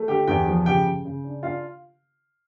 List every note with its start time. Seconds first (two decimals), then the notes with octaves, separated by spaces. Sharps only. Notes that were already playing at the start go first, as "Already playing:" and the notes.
Already playing: A3
0.08 D3 G4 G5
0.27 E2 G4 G5
0.47 F3
0.66 C#3 G4 G5
0.86 C#3
1.05 C#3
1.24 D4
1.43 D4 F4 F5